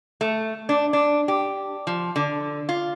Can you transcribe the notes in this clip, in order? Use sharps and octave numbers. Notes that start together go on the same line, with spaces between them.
A3
D4
D4
G4
F3
D3
F4